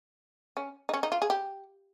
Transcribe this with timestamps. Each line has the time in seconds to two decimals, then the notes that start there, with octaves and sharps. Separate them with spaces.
0.57 C#4
0.89 D#4
0.94 C#4
1.03 D#4
1.12 F4
1.22 G#4
1.30 G4